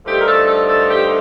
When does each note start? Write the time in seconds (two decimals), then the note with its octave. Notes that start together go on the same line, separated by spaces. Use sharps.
0.05 G2 D3 F3 A3 D#4 G4
0.20 A#4
0.26 A4
0.47 A4
0.69 A4
0.90 G4